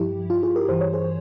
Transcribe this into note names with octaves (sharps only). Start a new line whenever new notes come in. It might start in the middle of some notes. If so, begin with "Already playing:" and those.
Already playing: G2 F3 E4 G4
F4
F4 G#4
G4 A#4
G2 E3 C5
C#5
G#4 C5